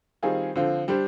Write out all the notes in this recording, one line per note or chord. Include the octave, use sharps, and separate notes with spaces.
D#3 G3 C4 F4 G#4
D3 F3 C4 F4
G3 D4 G4 C5